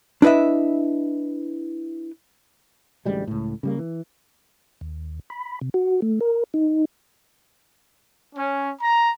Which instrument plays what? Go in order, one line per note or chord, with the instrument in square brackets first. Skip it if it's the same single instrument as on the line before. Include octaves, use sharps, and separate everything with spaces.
[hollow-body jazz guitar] D4 E4 B4 D#5 E5
[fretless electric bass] A1 D2 G3 G#3
C#2 A2
C#3 G3 A#3
E3
[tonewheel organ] D#2
B5
C3
F#4
A3
A#4
D#4
[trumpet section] C#4
A#5